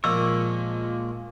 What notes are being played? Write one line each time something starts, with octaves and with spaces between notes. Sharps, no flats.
A#2 F3 G#3 A#3 C#5 D#5 E6